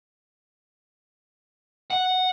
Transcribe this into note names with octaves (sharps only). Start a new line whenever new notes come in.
F#5